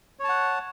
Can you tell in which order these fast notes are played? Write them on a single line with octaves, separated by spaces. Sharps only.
C#5 A5 F#5